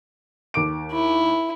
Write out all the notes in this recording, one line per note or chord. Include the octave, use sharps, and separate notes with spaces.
D#2 D6 D7
E4